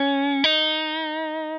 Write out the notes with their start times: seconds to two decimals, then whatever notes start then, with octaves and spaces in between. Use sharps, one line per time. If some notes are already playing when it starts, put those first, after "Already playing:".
Already playing: C#4
0.44 D#4